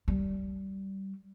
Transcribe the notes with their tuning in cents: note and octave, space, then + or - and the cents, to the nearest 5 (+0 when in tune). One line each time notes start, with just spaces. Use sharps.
G3 -20